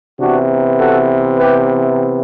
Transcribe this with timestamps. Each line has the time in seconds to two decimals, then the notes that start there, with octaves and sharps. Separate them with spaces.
0.18 C3 E3 B3 D4 F#4
0.78 F#4 A4
1.38 G4 B4